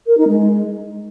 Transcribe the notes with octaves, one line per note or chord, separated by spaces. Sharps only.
A#4
D#4
G#3